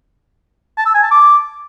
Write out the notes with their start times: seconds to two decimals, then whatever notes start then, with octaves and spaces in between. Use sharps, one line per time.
0.78 A5
0.86 E6
0.94 G#5
1.03 A5
1.11 D6